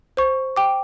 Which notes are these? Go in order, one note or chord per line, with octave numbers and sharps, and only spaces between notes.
C5 C#6
G5 D6